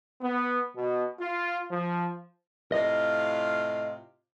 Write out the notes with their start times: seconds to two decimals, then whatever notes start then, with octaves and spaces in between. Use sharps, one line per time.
0.22 B3
0.76 B2
1.20 F4
1.71 F3
2.72 A2 C3 F4 D#5